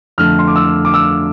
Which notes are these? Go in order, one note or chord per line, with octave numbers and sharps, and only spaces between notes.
F2 D3 A3 F6
C6
D6
E6
D6
E6